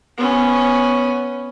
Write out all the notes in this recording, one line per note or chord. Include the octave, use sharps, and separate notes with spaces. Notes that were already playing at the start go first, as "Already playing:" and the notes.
B3 C#4